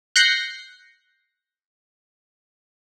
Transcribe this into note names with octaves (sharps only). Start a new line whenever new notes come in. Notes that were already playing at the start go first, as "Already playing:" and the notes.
F#6 G6 A#6 C7 C#7